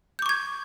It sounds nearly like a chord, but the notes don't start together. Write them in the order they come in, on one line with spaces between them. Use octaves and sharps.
G6 D6 C#6 G#6